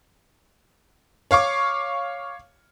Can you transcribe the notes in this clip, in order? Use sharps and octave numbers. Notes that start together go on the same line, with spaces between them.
C#5 F5 C#6 D6